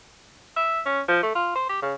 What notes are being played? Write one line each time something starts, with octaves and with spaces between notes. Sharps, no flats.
E5
C#4
F3
A3
F4
C5
G4
C#3